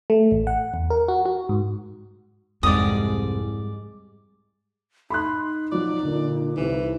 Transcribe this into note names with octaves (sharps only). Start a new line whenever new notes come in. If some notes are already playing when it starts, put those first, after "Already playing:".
A3
A1
F#5
E2
A#4
F#4
F#4
G#2
C2 F2 G#2 G3 G#3 D5 D#6
D#4 B5 C6 F#6
F3 F#3 D5
A#2 D3
C2 E3